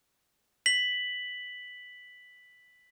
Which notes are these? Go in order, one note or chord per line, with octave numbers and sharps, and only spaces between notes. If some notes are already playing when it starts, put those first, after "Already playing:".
B6 F#7